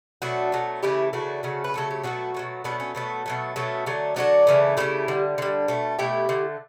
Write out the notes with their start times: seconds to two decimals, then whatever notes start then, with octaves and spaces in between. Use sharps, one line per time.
0.22 B2 F#3 A3 D4 F#4
0.52 B2 F#3 A3
0.83 C#3 E3 A3 E4 G4
1.13 C#3 E3 A3 D4 F#4
1.43 C#3 F#3 A3
1.64 B4
1.74 C#3 F#3 A3 A4
1.91 G4
2.03 B2 F#3 A3 D4 F#4
2.34 B2 F#3 A3
2.64 B2 F#3 A3 B3 D4
2.80 C#4
2.95 B2 F#3 A3 B3
3.26 B2 F#3 A3
3.56 B2 F#3 A3 C#4
3.86 D3 F#3 A3
4.16 D3 F#3 A3 D4 F#4
4.47 C#3 E3 A3
4.77 C#3 E3 A3 E4 G4
5.08 D3 G3
5.38 D3 G3
5.68 B2 A3
5.99 B2 A3 E4 G4
6.29 D3 A3